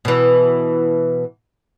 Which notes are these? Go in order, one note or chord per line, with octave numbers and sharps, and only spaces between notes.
B2 E3